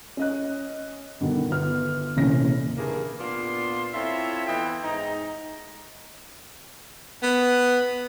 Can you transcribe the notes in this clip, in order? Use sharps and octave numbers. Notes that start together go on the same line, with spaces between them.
C#4 D#5 F#6
G2 B2 D3 D#3
G1 B3 F6
F1 A#2 C#3 E3 C#4 A#6
G2 E3 A#3 G#4 A#4
A#2 B3 D4 F4 C6
C4 E4 F4 A4 C#5 E5
E3 B3 D#5 E5 G5
G#2 D#4 A#5
B3